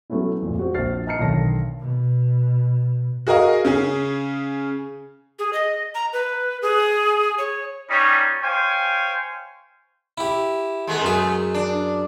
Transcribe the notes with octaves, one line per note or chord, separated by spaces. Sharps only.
F#3 A3 B3 C#4 E4
F2 A#2
C4 F4 F#4
A#1 C5 F6 A6 C7
D#5 A5 A#5 F6 C7 C#7
B1 D3 D#3 C#5 A5 A#6
B2
F#4 G#4 A#4 D#5 F5
C#3 C#4 G#4
G#4
D#5
A#5
B4
G#4
C#5
G3 C#4 D#4 C#5
C5 C#5 F5 G5 G#5
E4 G4
G#3 A3 B3
F#2 G#4
D4